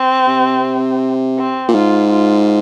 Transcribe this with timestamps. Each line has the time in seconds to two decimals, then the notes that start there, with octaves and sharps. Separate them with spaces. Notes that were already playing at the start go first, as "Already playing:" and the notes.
Already playing: C4
0.27 C3
1.38 C4
1.68 A#2
1.75 G#2 F4
2.11 F4